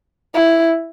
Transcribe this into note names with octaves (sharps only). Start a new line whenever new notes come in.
E4